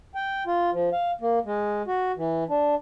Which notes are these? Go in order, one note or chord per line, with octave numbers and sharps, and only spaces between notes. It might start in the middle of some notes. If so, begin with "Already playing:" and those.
G5
F4
F3
F5
A#3
G#3
F#4
E3
D4